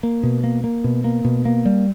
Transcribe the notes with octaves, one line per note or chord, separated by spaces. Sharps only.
A#3
B2
A#3
A#3
B2
A#3
B2
A#3
G3